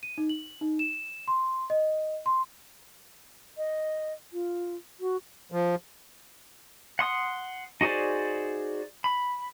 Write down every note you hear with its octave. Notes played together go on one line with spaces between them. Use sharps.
D#7
D#4
F#7
D#4
E7
C6
D#5
C6
D#5
F4
F#4
F3
F#5 C6 D#6
D#4 F#4 G#4 C5 D5
B5